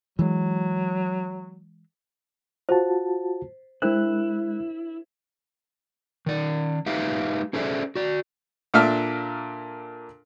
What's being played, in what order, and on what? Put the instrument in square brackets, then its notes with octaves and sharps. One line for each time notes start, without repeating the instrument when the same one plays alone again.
[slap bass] E3 G#3 [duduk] F#3
[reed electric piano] F4 F#4 A5 [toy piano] C5
[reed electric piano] G#3 F#6 [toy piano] D4 A#4 C5 [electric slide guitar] E4
[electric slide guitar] D#3 D5
G#3 D#4 G4 B4 E5 F5
C#4 G#4 A4 C5 D5 E5
F#4 D5
[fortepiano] A#2 A#3 D4 A4 E5 F6